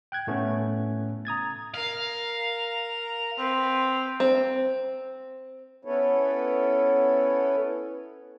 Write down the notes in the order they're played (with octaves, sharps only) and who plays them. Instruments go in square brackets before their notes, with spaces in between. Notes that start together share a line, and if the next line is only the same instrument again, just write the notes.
[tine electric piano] G5 F#6 G#6
A2 A3 B3 C#4
A#5 D#6 G#6 A6
[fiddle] A#4 [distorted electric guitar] F5
[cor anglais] C4 [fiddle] B4 F5
[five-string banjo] C4
[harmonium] B3 C#4 E4 A4 B4 C#5